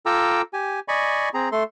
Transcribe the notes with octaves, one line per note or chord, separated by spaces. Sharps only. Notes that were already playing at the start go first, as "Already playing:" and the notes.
F4 A4 G5 A#5 D6 E6
G4 G#5
D5 D#5 G#5 B5 C#6
C4 G#4 A#5
A3 A4 C6